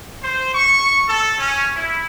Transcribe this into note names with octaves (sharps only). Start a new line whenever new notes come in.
C5
C#6
A4
C#4
E4